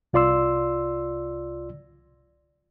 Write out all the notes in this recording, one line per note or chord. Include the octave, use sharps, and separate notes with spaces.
C2 F4 D5 C6 E6